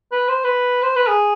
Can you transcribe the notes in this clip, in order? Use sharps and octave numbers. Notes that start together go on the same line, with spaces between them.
B4
C5
B4
C5
B4
G#4